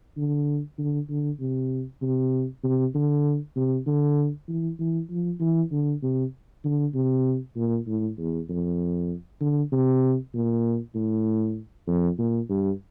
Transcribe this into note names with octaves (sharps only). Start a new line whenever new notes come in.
D3
D3
D3
C3
C3
C3
D3
C3
D3
E3
E3
F3
E3
D3
C3
D3
C3
A#2
A2
E2
F2
D3
C3
A#2
A2
F2
A#2
G2